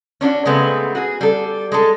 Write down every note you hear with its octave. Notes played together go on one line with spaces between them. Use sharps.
C#4 D4 E4 F#4
C#3 G#3 A3 B3 C4
F#4 G#4
G3 A4
G#3 A4